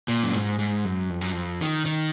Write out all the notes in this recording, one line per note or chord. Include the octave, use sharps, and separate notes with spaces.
A#2
F#2
G#2
G#2
F#2
F2
F#2
F2
D#3
D#3